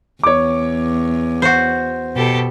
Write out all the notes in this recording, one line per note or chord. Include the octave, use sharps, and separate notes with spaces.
E2 C#5 D6
F#4 C5
B2 G4 A4